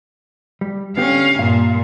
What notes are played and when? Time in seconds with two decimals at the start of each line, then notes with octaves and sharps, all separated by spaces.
0.61 G3
0.97 D3 B3 C#4 G4 F5
1.39 G2 A#2 F5